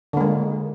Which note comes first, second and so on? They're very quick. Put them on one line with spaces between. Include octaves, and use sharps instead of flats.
D3 A#3 G#3